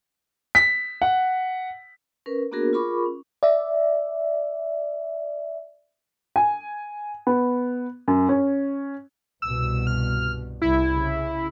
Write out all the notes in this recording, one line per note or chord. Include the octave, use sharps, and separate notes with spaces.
B6
F#5
C#4 A#4 B4
A#3 B3 D4 F#4 G#4 A#4
F4 G#4 A#4 B5 C#6 D6
C#4
D5 E5
G#5
B3
F#2
C#4
C2 G2 B2 E6
F6
C2 E4
C#3